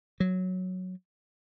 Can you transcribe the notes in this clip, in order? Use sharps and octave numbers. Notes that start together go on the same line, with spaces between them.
F#3